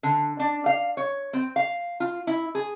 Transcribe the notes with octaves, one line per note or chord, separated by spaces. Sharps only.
D3
D4
F5
C#5
C4
F5
F4
E4
G#4